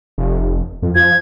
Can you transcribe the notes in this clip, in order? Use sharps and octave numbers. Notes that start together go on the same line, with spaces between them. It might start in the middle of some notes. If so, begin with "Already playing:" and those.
F1
F2
F3 G#6